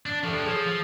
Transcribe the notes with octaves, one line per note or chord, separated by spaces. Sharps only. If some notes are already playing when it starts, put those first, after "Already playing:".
D4
F3 A3 D4 G4
F3 G#4 C#5 E6
F3